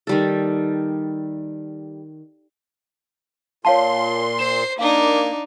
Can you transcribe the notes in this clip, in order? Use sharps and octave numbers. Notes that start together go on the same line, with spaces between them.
D#3 G3 A4
A#2 C#5 F5 A5 C6
C5 C7 E7
A#3 D4 D#4 F5